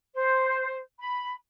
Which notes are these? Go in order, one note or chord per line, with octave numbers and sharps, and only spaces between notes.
C5
B5